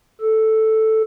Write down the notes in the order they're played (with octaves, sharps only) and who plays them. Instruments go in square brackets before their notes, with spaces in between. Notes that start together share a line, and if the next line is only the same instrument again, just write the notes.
[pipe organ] A4